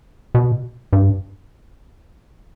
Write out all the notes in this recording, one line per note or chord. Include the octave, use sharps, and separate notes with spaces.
B2
G2